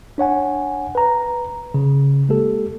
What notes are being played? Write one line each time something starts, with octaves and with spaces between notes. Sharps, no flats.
D4 C#5 F#5 G#5
B4 A#5
C#3
G#3 A#3 G4 A4